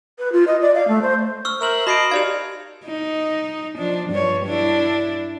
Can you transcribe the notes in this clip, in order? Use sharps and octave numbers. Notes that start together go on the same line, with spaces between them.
B4
F4
D#5
D5
F5
A3
C5
C#6 E6 F6
A#4 C5 E5 E6 F6 F#7
F#4 D#5 A5 B5 C7 D7
D#4 G4 D5 F5 G#6 F7
D#4
F3 D4
G2 G3 C#5
D4 E4